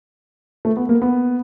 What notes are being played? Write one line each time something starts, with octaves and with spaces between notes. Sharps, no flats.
A3
B3
A#3
B3